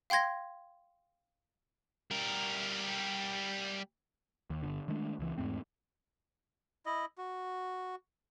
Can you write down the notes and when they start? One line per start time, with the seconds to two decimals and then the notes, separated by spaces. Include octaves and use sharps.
0.10 F5 G5 C6 G#6 A#6
2.11 G3 A#4
4.50 D#2
4.62 G1 D3
4.88 D#3 G#3 A3 D4
5.19 C#2 E3
5.38 E2 G#2 A3 C4
6.86 E4 D#5
7.18 F#4